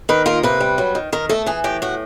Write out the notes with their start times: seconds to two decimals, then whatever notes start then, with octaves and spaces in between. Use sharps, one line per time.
0.09 D#3 B4
0.26 A#3 F4
0.43 C3 B4
0.60 G3
0.78 F#3
0.95 D#3
1.12 D#3 A#4
1.29 A3 A4
1.46 E3 G#4
1.64 A2 G4
1.82 A2 F#4